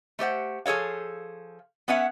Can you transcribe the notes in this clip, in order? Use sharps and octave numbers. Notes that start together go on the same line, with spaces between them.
A3 G4 C5 F#5
F3 G#4 A4 C#5 F5
B3 C#4 B4 E5 F#5